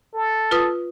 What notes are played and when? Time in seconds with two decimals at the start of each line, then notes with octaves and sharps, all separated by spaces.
0.13 A4
0.51 F4 B4 D#6